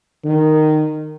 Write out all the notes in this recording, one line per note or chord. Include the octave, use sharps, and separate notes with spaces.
D#3